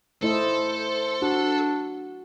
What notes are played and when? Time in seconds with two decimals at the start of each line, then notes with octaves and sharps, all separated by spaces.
0.23 A3 E4 A4 C5 D#5
1.22 D4 F#4